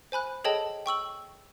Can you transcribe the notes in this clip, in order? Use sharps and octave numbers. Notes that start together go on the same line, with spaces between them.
C5 G#5 B5 F#6
G#4 A4 C#5 D#5 G5 A5
G5 C#6 E6 F#7